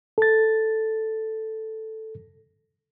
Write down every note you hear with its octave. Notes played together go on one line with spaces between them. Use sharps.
A4 A6